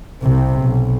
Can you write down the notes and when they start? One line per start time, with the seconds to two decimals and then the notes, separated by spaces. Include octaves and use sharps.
0.22 C2 C3
0.62 B1